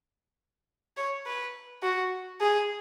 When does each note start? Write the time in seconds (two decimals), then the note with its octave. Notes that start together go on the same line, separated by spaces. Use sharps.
0.97 C#5
1.27 B4
1.83 F#4
2.40 G#4